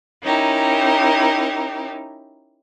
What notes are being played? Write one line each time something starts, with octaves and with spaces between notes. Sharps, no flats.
C#4 D#4 E4 G4 A#4